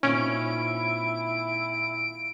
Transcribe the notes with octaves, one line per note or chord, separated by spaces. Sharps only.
A#2 D#3 C4 C#4 E4 D7